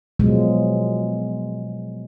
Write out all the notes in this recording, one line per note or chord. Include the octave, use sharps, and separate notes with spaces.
B2 F3 F#3 G#3